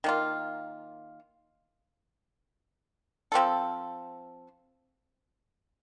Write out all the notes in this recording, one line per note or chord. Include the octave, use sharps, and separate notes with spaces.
D#3 A#3 F4
F3 C4 F4 A4